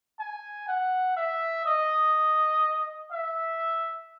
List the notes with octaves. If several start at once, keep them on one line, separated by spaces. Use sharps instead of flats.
G#5
F#5
E5
D#5
E5